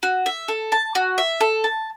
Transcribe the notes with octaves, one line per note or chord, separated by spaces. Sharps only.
F#4
E5
A4
A5
F#4
E5
A4
A5